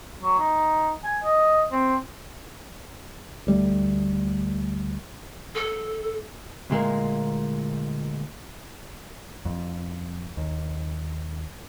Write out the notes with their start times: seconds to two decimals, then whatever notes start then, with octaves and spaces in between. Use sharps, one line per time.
0.22 F#3
0.39 D#4
1.04 G#5
1.24 D#5
1.72 C4
3.47 D2 G3 A3
5.55 A4
6.70 D2 A#2 G#3 A#3
9.45 F2
10.37 D#2